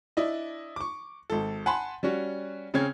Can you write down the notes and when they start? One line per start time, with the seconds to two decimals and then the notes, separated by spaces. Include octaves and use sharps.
0.17 D4 E4 D5 D#5
0.76 C#6 D6
1.30 G#1 A4
1.66 F#5 G#5 A5 B5 C6
2.03 G3 C#4 F#4
2.74 C#3 C4 C#4 G#6